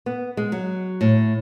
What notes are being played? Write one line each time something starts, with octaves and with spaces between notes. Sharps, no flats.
B3
G#3
F#3
A2